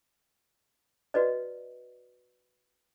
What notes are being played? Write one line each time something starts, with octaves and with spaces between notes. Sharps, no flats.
F#4 B4 D5 D#5